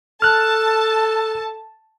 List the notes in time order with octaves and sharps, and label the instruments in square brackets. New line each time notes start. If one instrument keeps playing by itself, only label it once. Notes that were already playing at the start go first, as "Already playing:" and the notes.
[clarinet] A4 [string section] A5 [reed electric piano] F6 F#6